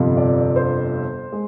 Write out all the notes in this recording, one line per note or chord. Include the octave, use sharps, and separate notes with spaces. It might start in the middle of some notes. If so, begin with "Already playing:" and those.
Already playing: G1 F2 C3 F3
D5
C5
G#3